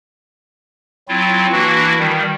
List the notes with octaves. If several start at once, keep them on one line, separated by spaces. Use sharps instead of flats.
F#3 C4 E4 F4
E3 A#3 D4 E4 F#4
D#3 G3